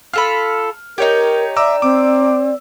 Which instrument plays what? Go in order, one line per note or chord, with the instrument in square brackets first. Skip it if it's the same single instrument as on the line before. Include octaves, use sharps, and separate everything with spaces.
[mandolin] F4 A4 B5 [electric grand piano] F6
[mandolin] D#4 G5 [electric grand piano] G4 C#5 [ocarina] A#4
[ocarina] D5 [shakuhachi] E5 [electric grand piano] A#5 D6 E6
[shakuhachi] C4 [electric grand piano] D6